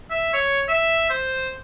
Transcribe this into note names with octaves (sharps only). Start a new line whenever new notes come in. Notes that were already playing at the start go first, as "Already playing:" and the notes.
E5
C#5
E5
C5